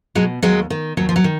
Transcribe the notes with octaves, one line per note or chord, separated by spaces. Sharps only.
B2 F#3 G#3
D#2 F#3 G#3
D#3
D#2 F#3
F3
F#3
D#3